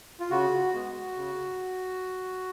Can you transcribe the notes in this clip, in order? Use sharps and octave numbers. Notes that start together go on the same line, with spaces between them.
F4
C#3 F#4
G#3 B3
C#3